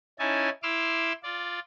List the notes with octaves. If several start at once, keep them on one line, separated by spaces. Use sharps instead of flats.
C#4 D#4 E4 G#5 A5
E4 C6 D6 E6 F6
F4 D5